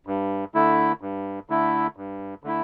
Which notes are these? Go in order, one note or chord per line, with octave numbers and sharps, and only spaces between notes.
G2
D3 A3 E4
G2
D3 A3 E4
G2
D3 A3 E4